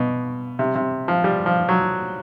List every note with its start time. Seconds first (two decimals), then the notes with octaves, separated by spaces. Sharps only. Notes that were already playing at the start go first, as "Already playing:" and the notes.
Already playing: B2
0.59 C3
0.75 C3
1.08 F3
1.24 G3
1.46 F3
1.69 F#3